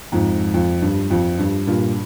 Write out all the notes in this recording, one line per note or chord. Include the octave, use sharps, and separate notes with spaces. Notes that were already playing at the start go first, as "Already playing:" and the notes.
F2 G#2
F2
G2
F2
G2
G2 A#2